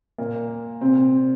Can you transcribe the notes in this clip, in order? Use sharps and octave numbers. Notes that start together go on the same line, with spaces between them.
A#2 A#3
C3 C4